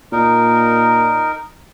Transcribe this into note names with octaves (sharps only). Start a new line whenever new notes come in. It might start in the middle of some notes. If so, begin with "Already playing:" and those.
A#2 D#4 A#4